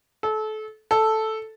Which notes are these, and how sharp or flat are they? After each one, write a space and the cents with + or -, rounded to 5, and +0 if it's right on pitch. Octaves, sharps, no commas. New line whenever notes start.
A4 -30
A4 -5